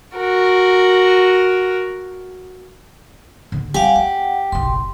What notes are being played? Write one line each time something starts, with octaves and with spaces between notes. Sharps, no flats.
F#4 A#4
D3 B3
G3 C4 G4 F5 F#5 G#5
B3 F#5
F#1 B1 C6